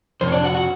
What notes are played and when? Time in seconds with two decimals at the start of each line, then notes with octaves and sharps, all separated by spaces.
0.21 F2 C3 C5
0.28 C#5
0.32 D4 D5
0.44 F#4 F#5
0.54 F#4 F#5